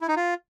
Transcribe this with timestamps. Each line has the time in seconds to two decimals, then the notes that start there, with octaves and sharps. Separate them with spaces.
0.01 E4
0.08 D#4
0.16 F4